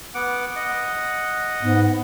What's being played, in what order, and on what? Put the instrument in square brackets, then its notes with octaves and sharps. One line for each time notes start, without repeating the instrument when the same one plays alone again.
[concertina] B3 F#5 D6
D#5 F#5
[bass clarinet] G#2 [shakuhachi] B3